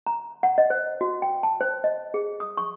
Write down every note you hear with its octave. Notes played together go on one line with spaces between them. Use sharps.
A#5
F#5
D#5
C5
F#4
G5
A5
C5
D#5
G#4
D#6
C#6